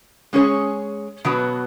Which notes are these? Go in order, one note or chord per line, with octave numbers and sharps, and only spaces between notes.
G#3 C#4 G#4 C#5
B2 F#3 B3 F#4